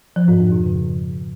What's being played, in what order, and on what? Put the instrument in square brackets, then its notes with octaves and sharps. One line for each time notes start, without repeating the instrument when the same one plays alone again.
[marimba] F3
G#2
F2
B2
C#3